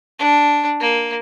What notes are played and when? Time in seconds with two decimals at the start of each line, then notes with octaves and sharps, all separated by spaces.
0.19 D4
0.81 A#3